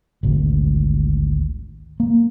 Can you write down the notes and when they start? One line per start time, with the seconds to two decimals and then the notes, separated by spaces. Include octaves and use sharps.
0.23 G#1 D2
2.00 A#3